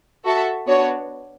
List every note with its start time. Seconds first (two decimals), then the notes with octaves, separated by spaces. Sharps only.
0.25 F#4 A4 E5 A5
0.66 B3 D4 F#4 C#5